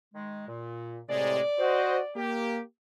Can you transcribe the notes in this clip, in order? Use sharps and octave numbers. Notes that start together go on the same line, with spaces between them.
D#3 G#3
A#2
A2 C3 G#3 D5
F#4 C5 D#5
A#3 G4